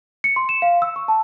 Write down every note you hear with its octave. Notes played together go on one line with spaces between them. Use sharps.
C#7
C6
E7
F5
E6
C#6
A5